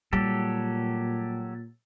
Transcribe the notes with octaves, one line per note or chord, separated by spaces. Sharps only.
A#2 F#3 G3 G4 A4